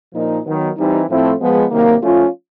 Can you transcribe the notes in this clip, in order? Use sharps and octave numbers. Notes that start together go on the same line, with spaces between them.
A#2 F3 A#3 D#4
D#3 F#3 B3
E3 G3 C4 D#4
A2 F3 A3 C4 E4
F3 G#3 B3
C3 D#3 F#3 A#3
F3 A3 C#4 F4